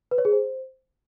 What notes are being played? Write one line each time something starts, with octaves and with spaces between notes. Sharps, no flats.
B4
C#5
G#4
C5